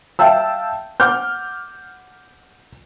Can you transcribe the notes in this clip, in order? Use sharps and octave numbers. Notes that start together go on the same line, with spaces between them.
E5 F5 G5 A5 E6
F#5 D6 F6 G6